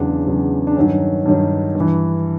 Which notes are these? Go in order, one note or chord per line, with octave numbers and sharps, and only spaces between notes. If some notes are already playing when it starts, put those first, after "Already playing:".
Already playing: E2 C#3 F#3 D4
E2 C#3 F#3
D4
G2 D#3 F#3 C#4
G2 D#3 F#3
G2
E3